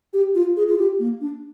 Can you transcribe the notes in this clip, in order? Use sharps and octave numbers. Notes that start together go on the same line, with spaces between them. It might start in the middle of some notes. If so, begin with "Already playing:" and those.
G4
F4
G#4
F4
G4
A#3
D4